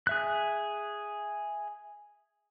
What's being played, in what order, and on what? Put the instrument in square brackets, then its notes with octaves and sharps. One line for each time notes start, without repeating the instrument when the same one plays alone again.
[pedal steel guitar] G#4 E5 F#6